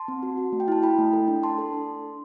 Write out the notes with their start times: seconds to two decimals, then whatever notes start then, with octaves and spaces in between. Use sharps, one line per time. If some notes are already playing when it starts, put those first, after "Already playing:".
Already playing: A5 C6
0.08 C4
0.23 F#4
0.38 F#4
0.52 A3
0.60 G5
0.68 E4 A5
0.82 E4 G5 B5
0.98 A3
1.13 A4
1.28 D4
1.43 D4 A5 C6
1.58 A4
1.73 D4